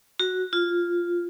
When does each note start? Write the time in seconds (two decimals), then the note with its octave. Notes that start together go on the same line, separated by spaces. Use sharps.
0.20 F#4
0.53 F4